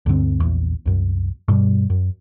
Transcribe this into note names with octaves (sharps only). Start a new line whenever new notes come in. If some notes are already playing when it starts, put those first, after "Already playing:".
D2 G2 D3 C4
A#1 E2
C2 F#2
G2 B2 G3
F#2